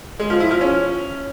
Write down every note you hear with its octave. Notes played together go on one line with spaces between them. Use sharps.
G#3
F3
E4
F3
C#4